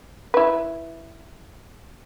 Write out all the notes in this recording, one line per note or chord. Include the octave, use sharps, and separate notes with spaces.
E4 B4